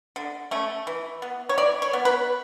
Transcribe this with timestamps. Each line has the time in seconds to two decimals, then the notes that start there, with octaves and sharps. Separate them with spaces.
0.16 D3
0.51 A3 C#4
0.87 E3
1.22 B3
1.49 C#5
1.58 E3 D5
1.82 C#5
1.93 B3
2.05 B4